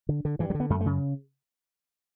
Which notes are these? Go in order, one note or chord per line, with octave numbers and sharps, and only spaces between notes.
D3
D3
G2 E3
F#3
D3
B3
F#2 A3
A3
C#3